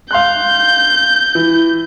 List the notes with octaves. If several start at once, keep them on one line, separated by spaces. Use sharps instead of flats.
F5 C6 F#6 G6
E3